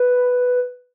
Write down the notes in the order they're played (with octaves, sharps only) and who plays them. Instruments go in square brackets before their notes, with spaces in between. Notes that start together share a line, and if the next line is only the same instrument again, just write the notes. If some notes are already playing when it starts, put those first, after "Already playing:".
Already playing: [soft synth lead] B4